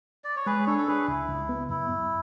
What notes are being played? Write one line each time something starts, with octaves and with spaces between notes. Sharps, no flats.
D5
C#5
G#3 G#4 B4
D4 A4 C#5
A4
D4 G#4 B4
C#2 E4
C#2
B3
F#2 E4
F#2